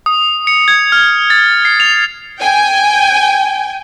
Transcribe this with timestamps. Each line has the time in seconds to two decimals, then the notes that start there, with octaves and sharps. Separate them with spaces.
0.06 D#6
0.47 C#7
0.68 G#6
0.92 F6
1.30 A6
1.65 C7
1.80 F7
2.41 G5 G#5